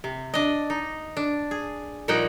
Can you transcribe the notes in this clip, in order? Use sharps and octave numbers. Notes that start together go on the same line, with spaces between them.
C3
D4 D#5
D#4
D4
G#4
A#2 F3 G3 D#4 F#5 G5